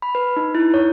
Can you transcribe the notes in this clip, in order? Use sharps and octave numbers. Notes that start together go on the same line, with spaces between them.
B5
B4
D#4
E4
C#5